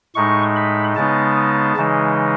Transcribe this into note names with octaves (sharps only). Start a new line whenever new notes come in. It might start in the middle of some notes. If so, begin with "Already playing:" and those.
A2 G#3 D#4 C#6
B5
C#3 G#3 B3 D#4 A5
C#3 E3 G#3 D#4